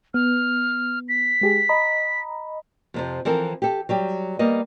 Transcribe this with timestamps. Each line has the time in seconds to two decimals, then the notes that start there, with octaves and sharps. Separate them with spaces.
0.14 B3 F6
1.09 B6
1.41 G#3 G4 G#4
1.69 D#5 A#5 B5
2.94 F2 C3 F3
3.25 E3 F3 C4 A4 A#4
3.62 G4 A4
3.89 F#3 G3 G4
4.39 G3 A#3 B3 D#5